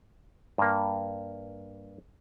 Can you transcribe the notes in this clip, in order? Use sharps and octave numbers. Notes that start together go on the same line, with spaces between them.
G2 A#3